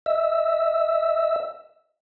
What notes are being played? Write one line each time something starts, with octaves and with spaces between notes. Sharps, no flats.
D#5 E5 E6